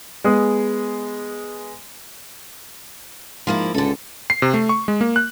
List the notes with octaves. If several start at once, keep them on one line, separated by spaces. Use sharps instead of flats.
G#3 B3 G#4
G#2 F3 A#3 E4
C#2 D3 A4
C7
C3
A3
C#6
G#3
A#3
F#6